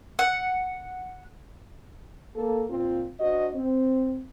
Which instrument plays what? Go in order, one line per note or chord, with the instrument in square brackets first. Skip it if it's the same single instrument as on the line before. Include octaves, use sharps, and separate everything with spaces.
[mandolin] F#5
[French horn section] A#3 A4
A#2 C4 F4
D4 F#4 C5 D#5
C4